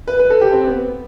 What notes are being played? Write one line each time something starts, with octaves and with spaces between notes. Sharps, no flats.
B4
B4
A4
G4
C4
B3